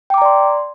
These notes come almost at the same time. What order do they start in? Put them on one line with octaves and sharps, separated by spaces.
G5 D6 A#5 D5 C6